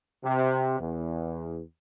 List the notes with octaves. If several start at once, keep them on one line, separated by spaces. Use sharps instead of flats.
C3
E2